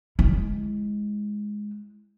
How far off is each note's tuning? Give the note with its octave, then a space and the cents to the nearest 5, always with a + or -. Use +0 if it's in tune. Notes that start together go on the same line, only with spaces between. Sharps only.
G#3 +0 E4 +10